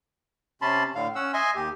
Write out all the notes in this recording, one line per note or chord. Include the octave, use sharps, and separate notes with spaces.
C3 C#4 A5 B5 C6
A2 D3 F5
C#4 F#5 E6
D#5 E5 G#5 C6
D#2 G4